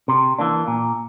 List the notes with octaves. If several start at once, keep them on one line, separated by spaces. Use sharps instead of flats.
C3
E3 A#3 D4
A#2